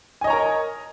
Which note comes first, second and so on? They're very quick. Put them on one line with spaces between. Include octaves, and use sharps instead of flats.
G#5 D#5 C#5 A#5 A#4